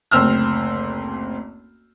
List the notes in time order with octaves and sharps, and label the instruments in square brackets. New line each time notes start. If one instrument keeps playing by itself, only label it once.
[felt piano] F#1 D2 C4 E6 F6